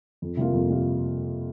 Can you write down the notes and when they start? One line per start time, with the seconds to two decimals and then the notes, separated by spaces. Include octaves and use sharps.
0.22 F2
0.37 C3 G3 A#3 F4
0.53 F2
0.68 C3 G3 A#3 F4